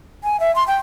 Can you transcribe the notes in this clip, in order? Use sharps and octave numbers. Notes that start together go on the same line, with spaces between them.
G#5
E5
C6
G5